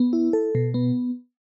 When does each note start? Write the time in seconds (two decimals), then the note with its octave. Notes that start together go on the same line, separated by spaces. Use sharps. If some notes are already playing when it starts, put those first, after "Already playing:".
Already playing: B3
0.13 E4
0.33 A4
0.55 B2
0.74 B3